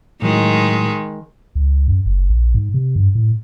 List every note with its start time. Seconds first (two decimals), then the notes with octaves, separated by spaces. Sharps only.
0.22 A2 D#3 F#3 G#3
1.55 C#2
1.88 F#2
2.06 F#1
2.29 A#1
2.55 G#2
2.74 C3
2.96 G2
3.15 A2